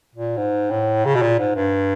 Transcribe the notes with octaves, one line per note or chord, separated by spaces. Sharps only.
A#2
G#2
A2
C#3
B2
A#2
G#2
G2